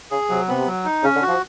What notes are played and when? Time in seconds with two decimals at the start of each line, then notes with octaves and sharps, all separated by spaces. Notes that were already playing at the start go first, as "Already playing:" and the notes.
0.11 C#3 G#4
0.29 C3 F#3
0.48 C3 B3
0.66 F#3
0.85 D#4
1.03 C#3 C#4
1.16 D3
1.22 F#4
1.28 F3